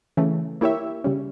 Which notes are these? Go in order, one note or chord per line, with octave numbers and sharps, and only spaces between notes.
C#3 E3 A3
A#3 E4 G4 C#5 E5
C#3 G3 C#4